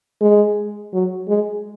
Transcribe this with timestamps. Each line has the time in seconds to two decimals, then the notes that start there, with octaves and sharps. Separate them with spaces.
0.21 G#3
0.93 F#3
1.29 G#3